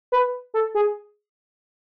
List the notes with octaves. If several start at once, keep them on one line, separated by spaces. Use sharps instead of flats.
B4
A4
G#4